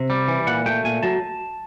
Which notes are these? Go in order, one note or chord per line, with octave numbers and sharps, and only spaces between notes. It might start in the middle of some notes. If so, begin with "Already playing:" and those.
Already playing: C3
G3
E3
A#2 F#5
A3 G5
A#2 G#5
F#3 A5